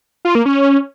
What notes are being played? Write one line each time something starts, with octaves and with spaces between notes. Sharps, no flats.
F4
A#3
C#4